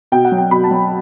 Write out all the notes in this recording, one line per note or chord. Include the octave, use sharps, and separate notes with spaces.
B2 G5
F#5
F#3
G5
B2 B5
A5
F#3